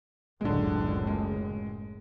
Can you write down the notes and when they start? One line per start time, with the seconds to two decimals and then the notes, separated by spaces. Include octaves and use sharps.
0.41 F#1 C#2 A2 D3 G#3
1.07 G#3